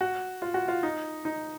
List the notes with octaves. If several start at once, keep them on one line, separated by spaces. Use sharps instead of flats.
F#4
F4
F#4
F4
D#4
D#4